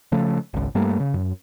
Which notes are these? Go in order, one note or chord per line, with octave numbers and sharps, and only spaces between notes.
C#3 F3 A3
G#1 C#2
G2 G3 A3 A#3
C#3
F#2